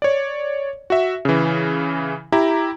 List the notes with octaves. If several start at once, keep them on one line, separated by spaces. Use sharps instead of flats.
C#5 D5
F#4 E5
C#3 E3
E4 G4 A#5